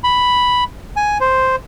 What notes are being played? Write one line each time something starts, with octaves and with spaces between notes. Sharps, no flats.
B5
G#5
C5